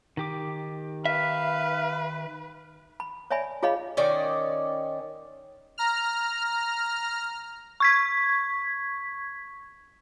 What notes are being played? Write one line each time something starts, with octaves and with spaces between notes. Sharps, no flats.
D#3 G4 D6
B4 E5 F5
B5
C#5 D5 E5 G#5 B5
F4 G#4 C#5 D#5 F5 B5
D#3 C#4 D5 D#5
A#5 F6
C#6 G#6 B6